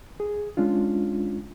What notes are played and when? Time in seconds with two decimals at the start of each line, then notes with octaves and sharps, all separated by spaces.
0.20 G#4
0.57 G#3 C#4 D4 F4